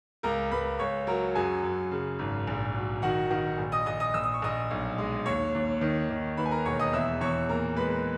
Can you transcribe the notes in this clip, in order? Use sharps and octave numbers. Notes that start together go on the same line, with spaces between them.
C#2 A#4 A#5
C#2 B4 B5
C#2 C#5 C#6
F#3 A#4 A#5
F#2 G#4 G#5
F#2
C#3
G#1
A#1
F#3
D#3 F#4 F#5
D#3 F#4 F#5
A#1
D#5 D#6
A#1 D#5 D#6
D#5 D#6
A#1 E6
D#6
C#6
A#1 D#5 D#6
B1
G#3
D#2 C#5 C#6
D#2
D#3
D#3
D#2 B4 B5
G#5
A#4 A#5
E1 C#5 C#6
D#5 D#6
E2 E5 E6
E2 C#5 C#6
A#2 A#4 A#5
G#3 B4 B5